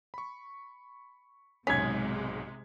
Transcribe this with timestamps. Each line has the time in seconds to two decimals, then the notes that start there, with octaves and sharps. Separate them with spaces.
0.14 B5 C#6
1.67 B1 G#2 C3 G#3 C#4 D#6 G#6 B6